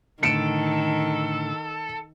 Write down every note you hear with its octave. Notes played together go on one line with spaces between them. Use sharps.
A2 D3 D#3 A4 C#7 D7 E7